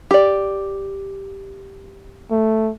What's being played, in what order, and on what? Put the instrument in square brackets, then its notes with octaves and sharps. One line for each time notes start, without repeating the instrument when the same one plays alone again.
[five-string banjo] G4 D5
[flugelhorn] A3